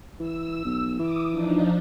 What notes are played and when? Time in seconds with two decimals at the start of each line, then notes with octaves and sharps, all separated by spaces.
0.19 E3 E6
0.65 B1
0.99 E3 D6 D#6
1.30 F3 D4 D#4